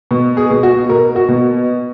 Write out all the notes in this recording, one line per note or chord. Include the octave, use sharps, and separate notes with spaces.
B2
G#4
B2
F#4
B2 A#4
F#4
B2